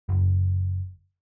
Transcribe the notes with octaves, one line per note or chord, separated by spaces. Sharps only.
F#1